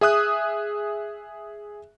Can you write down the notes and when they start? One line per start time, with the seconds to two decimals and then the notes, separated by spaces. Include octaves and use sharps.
0.01 G#4 E5 D#6 F#6